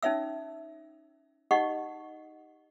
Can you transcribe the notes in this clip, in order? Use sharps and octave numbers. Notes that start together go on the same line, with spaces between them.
C#4 D#4 C#5 E5 E6
D#4 G4 D#5 F#5 C#6